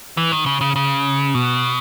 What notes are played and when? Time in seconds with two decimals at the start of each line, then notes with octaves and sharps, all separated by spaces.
0.17 E3
0.32 D#3
0.46 C#3
0.61 C#3
0.76 C#3
1.35 B2